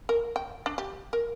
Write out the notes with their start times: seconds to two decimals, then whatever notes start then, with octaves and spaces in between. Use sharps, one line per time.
0.09 A#4
0.36 G5
0.66 D4
0.78 G4
1.13 A#4